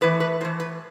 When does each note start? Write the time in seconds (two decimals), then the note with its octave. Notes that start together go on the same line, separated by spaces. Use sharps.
0.01 A2 E3 B4
0.20 B4
0.41 A2 C5
0.45 E3
0.60 B4